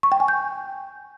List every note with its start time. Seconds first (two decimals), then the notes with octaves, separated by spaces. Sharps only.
0.03 C#6
0.12 G5
0.20 G#5
0.28 G6